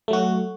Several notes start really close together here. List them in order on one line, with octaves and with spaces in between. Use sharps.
A3 F#3 F#4